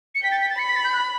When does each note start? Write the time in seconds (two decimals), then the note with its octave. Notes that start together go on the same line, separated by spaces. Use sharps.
0.15 C#7
0.23 G5 B6
0.31 A6
0.41 B6
0.50 A6
0.58 B5 C#7
0.68 B6
0.76 A6
0.84 G6
0.93 F#6